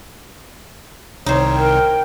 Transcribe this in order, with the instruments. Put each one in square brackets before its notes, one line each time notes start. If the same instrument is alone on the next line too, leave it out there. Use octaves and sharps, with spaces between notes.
[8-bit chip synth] C2 C3 D#3 [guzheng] D#4 C5 [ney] C#5
[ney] A#4 [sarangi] G5